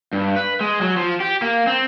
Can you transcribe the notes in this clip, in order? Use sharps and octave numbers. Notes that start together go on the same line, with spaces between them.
G2
B4
G#3
F#3
F3
G4
A#3
C4